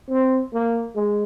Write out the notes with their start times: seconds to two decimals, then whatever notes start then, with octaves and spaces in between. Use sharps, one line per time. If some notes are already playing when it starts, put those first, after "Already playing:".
0.11 C4
0.54 A#3
0.96 G#3